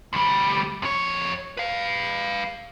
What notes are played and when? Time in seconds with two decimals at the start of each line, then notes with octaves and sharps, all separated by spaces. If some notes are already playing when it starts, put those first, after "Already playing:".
0.13 D2 G3
0.82 F2 C#5
1.57 B4 F5